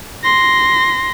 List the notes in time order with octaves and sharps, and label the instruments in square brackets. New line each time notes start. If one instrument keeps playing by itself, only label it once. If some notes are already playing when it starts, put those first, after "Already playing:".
[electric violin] C6 A#6